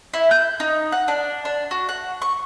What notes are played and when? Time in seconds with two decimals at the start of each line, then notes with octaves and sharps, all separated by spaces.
0.14 E4
0.31 G6
0.60 D#4
0.92 F#5
1.08 D4
1.45 D4
1.71 F#4
1.89 F#5
2.22 C#6